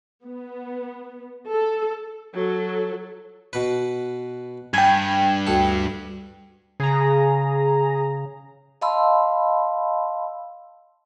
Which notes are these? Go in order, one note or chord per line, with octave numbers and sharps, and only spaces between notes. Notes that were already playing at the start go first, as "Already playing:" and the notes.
B3
A4
F#3 A4
B2 B4
G2 G5 G#5 G#6
D2 A4
C#3 G#4 A#5
D#5 F5 A5 B5 C6 E6